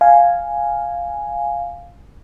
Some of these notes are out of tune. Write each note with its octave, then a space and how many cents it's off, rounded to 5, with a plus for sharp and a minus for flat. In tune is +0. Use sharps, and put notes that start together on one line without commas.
F5 +0 G#5 +0